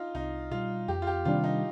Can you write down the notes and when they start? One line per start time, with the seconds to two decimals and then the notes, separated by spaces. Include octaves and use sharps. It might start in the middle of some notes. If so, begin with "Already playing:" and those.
Already playing: D#4 F4
0.15 C2 D#4
0.51 B2 G3 F4
0.88 F2 G4
1.02 F4
1.07 G4
1.25 C3 D#3 G3 D4 F4
1.44 D#4